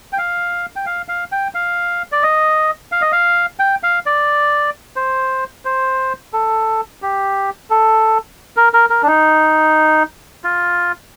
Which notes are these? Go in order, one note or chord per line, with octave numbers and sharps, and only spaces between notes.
G5
F5
G5
F5
F5
G5
F5
D5
D#5
F5
D#5
F5
G5
F5
D5
C5
C5
A4
G4
A4
A#4
A#4
A#4
D4
D#4
F4